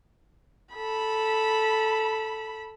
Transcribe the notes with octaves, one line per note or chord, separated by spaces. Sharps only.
A4 B5